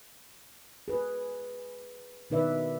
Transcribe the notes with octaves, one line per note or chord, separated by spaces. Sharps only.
G#4 B4
B2 D#3 D#4 B4 D5 E5